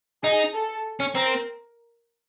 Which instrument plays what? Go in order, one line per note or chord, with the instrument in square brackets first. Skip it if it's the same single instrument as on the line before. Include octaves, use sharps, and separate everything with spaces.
[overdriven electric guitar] D#4 [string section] G#4
[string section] A4
[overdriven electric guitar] C#4
[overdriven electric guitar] C4 [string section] A#4